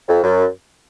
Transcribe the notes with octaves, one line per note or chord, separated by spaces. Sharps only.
F2
F#2